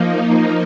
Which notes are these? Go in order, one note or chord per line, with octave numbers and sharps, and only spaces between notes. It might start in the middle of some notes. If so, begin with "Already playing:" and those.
Already playing: F3 A#3 D#4